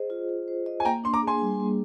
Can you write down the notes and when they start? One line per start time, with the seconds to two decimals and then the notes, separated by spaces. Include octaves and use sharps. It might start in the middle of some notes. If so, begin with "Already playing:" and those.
Already playing: G#4 C5 D#5
0.10 F4
0.29 F4
0.48 C5
0.66 D#5
0.80 G#5
0.85 A#3 G5 A#5
1.04 D4 C6
1.13 A#5 D6
1.23 G#4 G#5 C6
1.42 G3
1.60 A#3